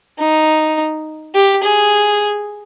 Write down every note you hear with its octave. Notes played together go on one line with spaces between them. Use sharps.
D#4
G4
G#4